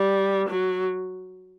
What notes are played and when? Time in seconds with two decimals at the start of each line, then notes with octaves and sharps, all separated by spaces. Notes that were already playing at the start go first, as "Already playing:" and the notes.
Already playing: G3
0.49 F#3